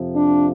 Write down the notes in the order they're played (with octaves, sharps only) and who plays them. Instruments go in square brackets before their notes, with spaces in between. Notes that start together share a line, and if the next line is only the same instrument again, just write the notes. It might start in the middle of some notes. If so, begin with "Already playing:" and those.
Already playing: [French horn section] F2 C3 F3
D4